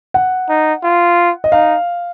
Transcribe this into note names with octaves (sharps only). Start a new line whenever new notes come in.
F#5
D#4
F4
D#5
D#4 F5